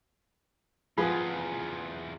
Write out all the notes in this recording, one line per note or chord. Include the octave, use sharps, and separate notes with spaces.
E2 F3 F4 G#4 B4 F#5 B5